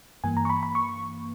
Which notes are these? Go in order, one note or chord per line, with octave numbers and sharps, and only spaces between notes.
G2 E3 A#3 G#5
A#5
C#6
B5
B5
C#6